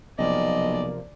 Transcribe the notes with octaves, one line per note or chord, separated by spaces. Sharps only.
B1 C3 F3 A#3 D5 D#5